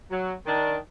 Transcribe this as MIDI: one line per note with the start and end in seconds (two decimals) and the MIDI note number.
0.11 0.33 54
0.46 0.76 51
0.46 0.76 62